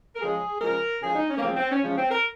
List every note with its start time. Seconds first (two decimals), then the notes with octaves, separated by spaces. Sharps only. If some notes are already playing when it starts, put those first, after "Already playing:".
0.16 A#4
0.21 C#3 F3 G#3 G#4
0.61 C#3 F3 G#3 A#4
1.02 C#3 F3 G#3 G#4
1.16 D#4
1.30 C#4
1.38 A#3
1.43 C#3 F3 G#3 C4
1.56 C4
1.71 C#4
1.84 C#3 F3 G#3 C#4
1.98 C4
2.11 A#4